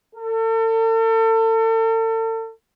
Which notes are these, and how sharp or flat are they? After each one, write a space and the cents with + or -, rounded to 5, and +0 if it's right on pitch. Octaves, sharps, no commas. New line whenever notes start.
A4 +40